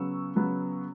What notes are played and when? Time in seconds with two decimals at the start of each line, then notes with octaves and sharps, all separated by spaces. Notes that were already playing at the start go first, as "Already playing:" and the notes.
Already playing: C#3 F#3 B3 C#6 E6
0.36 C#3 F#3 B3